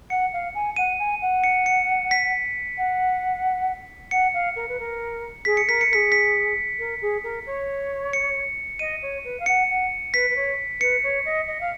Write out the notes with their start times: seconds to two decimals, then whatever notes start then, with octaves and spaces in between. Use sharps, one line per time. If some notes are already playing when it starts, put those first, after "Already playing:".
0.10 F#5 C#7
0.33 F5
0.54 G#5
0.76 F#5 D#7
0.99 G#5
1.22 F#5
1.44 C#7
1.66 C#7
2.11 B6
2.78 F#5
4.11 F#5 C#7
4.33 F5
4.56 A#4
4.68 B4
4.79 A#4
5.45 G#4 B6
5.57 C#7
5.68 A#4 B6
5.81 C#7
5.91 G#4 A#4 B6
6.12 B6
6.79 A#4
7.01 G#4
7.23 A#4
7.46 C#5
8.13 C#7
8.79 D#5 D#7
9.02 C#5
9.24 B4
9.39 F5
9.46 F#5 C#7
9.69 F#5
10.14 B4 B6
10.30 B4
10.36 C#5
10.81 B4 C#7
11.03 C#5
11.25 D#5
11.47 D#5
11.60 F5